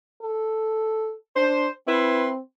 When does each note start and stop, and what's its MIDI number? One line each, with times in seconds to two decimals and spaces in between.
0.22 1.14 69
1.36 1.68 62
1.36 1.70 72
1.87 2.40 60
1.87 2.29 64
1.87 2.29 71
1.87 2.29 84